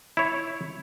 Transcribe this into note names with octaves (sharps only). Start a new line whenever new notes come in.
E4 C#5